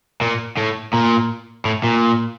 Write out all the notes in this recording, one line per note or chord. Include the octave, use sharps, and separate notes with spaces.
A#2
A2
A#2
A2
A#2